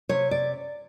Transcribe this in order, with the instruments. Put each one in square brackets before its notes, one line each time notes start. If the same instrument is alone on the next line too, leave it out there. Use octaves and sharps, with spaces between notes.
[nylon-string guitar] C3 C#5
D5